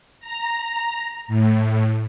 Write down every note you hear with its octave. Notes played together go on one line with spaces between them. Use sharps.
A#5
A2